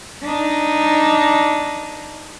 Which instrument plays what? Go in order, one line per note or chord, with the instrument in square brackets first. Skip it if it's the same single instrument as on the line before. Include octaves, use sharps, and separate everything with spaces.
[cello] D4 D#4